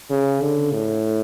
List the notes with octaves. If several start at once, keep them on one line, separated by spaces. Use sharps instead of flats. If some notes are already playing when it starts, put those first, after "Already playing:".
C#3
D3
A2